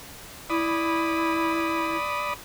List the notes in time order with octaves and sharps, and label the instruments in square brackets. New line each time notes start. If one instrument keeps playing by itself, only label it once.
[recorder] E4 [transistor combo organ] D5 B5 D#6